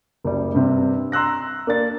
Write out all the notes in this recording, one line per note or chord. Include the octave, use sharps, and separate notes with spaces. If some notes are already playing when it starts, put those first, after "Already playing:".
F#1 G3
G2 C3 C4
A#5 C6 E6 F#6 A#6
A#3 D4 A6